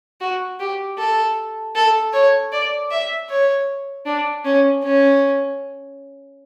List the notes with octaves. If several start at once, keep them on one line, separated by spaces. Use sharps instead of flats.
F#4
G4
A4
A4
C#5
D5
E5
C#5
D4
C#4
C#4